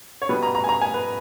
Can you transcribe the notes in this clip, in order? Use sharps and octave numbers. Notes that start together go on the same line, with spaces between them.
C#5
B2 G3 B3 B4
A#5
A#5
G#5
A#5
G#5
B4